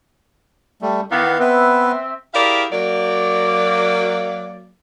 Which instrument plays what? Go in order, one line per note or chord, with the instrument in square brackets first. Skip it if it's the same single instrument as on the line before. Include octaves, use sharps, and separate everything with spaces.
[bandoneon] G3 A3
[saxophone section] D#3 E3 B3 [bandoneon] F5
[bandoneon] B3 B4 [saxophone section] C4 E5
[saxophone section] E4 G4 G#4 A#4 D5 F5
F#3 A#3 D5